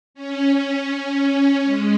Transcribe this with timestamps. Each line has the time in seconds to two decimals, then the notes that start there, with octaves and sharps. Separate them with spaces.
0.14 C#4
0.89 C#4
1.64 G#3